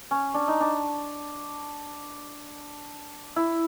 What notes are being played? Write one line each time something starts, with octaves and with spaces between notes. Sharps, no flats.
C#4
D4
D#4
D4
E4